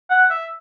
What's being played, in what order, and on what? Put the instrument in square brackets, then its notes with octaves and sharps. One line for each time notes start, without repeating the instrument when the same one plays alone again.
[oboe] F#5
E5